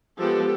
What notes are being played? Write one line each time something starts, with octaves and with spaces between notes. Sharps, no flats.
F3 G#3 B3 G4 A4